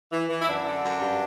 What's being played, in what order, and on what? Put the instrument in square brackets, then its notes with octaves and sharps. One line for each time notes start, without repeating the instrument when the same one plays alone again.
[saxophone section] E3
E3
E4
F#2 D4
D3
F#2
G2